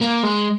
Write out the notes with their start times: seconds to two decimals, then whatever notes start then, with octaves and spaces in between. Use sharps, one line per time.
0.01 A#3
0.23 G#3